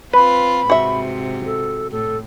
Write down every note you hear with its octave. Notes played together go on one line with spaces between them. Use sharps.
C4 F4 B4 B5
G#2 C3 F#4 E5
A4
A2 A4